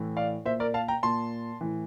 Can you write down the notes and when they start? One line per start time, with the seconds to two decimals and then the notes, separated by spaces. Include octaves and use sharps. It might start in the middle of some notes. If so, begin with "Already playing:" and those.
Already playing: A2 E3
0.17 D5 F5
0.45 A#2 C5 E5
0.60 A#4 D5
0.74 F5 A5
0.88 G5 A#5
1.03 A#2 A5 C6
1.61 A2 E3